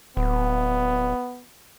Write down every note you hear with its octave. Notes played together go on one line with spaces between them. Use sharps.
D1 B3